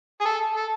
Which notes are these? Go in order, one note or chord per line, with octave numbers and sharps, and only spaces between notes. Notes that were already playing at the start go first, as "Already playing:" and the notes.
G#4
A4
A4